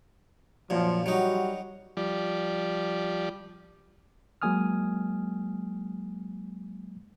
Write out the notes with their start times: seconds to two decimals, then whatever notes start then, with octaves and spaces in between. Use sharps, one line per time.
0.70 F#2 A#2 F3
1.06 F#3 G3 D#4 F#4
1.97 F3 G3 D5
4.42 F#3 G#3 A#3 G#5 D#6 F6